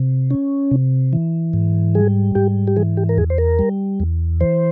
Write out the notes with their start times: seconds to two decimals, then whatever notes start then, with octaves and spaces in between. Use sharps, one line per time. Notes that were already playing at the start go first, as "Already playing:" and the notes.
Already playing: C3
0.31 C#4
0.71 C3
1.13 E3
1.53 G#2
1.95 G3 G#4
2.35 G#2 G4
2.67 G4
2.76 E3 G#4
2.97 G4
3.09 A#4
3.17 E2 G#4
3.30 C5
3.38 A#4
3.59 G3
4.00 E2
4.41 E3 C5